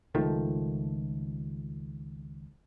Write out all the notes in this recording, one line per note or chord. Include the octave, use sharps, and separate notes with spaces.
C#2 D#3 F3 A3